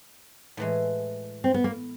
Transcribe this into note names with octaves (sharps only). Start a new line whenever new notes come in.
A2 E3 G#3
C4
B3
A#3